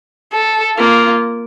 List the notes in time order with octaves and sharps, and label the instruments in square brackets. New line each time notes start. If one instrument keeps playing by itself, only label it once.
[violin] A4
[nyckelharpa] A#3 [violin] F4